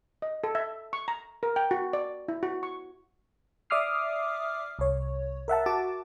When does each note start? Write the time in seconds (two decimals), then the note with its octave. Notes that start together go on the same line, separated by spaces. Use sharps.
0.22 D#5
0.44 A4
0.55 E5
0.93 C#6
1.08 A#5
1.43 A#4
1.56 G5
1.71 F#4
1.93 D5
2.28 E4
2.43 F#4
2.63 C#6
3.70 D5 E5 D6 D#6 F6 C7
4.79 C2 C#5
5.48 A#4 E5 F#5 A5
5.66 F#4 A5 D6